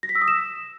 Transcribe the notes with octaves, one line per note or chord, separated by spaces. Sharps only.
A#6
B6
E6
D#6
E7